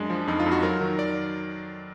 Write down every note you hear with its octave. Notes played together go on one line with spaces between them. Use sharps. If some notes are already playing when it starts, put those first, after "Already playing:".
Already playing: F#2 G#3 D4
F3
F2 D#4
F4
F2
F#4
F#3 A#4
D#3
D5